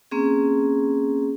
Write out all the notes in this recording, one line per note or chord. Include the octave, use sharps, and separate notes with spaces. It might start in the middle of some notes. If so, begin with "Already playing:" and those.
A#3 C4 C#4 G#4